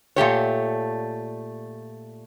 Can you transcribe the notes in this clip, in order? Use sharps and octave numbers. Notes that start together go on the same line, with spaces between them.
A#2 A3 G4 C#5